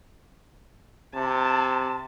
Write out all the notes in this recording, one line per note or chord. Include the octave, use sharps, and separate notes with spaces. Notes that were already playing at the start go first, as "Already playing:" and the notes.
C3 A5